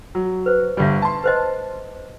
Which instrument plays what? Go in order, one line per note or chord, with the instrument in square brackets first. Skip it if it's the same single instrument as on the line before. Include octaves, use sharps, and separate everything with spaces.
[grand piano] F#3
[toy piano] B4 C5
[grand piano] G1 G3 [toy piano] D5 E5
[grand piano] A5 C6
[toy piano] B4 C5 D#5